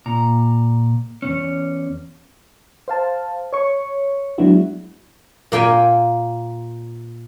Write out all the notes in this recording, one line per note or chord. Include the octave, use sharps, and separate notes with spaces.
A#2 A#5
E2 G#2 C#4
C5 F5 A5
C#5 C#6
F#3 G#3 B3 D4 E4 F#4
A#2 A#3 G5 G#5